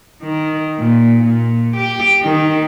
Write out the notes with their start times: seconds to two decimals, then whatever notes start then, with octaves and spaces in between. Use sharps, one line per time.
0.22 D#3
0.80 A#2
1.23 A#2
1.76 G4
2.23 D#3